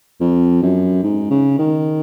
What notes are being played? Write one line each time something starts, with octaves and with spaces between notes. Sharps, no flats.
F2
F#2
G#2
C#3
D#3